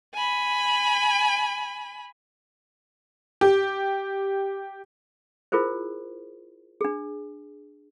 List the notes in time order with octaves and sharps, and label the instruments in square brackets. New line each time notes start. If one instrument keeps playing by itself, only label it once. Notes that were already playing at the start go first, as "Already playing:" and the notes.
[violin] G#5 B5
[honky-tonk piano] G4
[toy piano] E4 F4 G#4 A#4 C5
D4 G#4